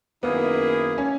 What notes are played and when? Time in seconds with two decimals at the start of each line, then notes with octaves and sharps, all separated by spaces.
0.23 F#2 D#3 A#3 B3 E4 G#4
0.98 C#4